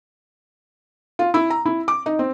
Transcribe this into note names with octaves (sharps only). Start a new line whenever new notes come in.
F4
E4
A#5
E4
D6
D#4
C4